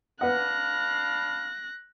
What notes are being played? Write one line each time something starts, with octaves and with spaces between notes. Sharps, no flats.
D4 B4 F5 F#5 B5 F#6 A#6